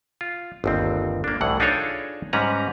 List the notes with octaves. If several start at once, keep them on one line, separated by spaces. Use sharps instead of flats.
F4
G1 D#2 C4
A#3 D4
C2 A2 E3 F#5
D4 D#4 F4 G#4 A4 C#5
G#2 G3 C#4 B4 A#5